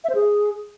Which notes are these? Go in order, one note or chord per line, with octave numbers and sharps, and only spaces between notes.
E5
C5
G#4